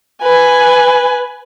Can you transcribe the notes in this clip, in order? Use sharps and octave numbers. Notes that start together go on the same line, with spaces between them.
B4 G#5